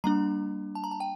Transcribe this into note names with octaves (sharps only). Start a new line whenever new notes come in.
G3 A#3 D4 A#5
A5
A#5
A5
G5